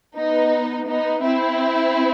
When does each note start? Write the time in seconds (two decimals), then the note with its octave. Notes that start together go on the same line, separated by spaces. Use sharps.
0.16 B3 D#4
0.88 B3 D#4
1.23 C4 E4